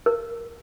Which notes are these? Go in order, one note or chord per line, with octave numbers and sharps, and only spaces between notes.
A#4